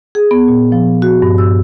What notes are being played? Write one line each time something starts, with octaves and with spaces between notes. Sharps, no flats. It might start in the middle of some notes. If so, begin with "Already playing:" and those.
G#4
B3
A#2
F3
F#4
G2
E6